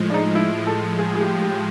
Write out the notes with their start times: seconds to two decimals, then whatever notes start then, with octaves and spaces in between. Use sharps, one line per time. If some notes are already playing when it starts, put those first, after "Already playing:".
Already playing: A2 F3 G#3
0.10 D4
0.14 D#4
0.35 E4
0.67 A4
0.99 G#4
1.15 G#4
1.20 G4
1.42 G4